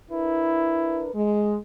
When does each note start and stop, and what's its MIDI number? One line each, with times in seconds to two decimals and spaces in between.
0.11 1.13 62
0.11 1.05 64
0.11 1.13 70
0.11 1.13 71
1.13 1.56 56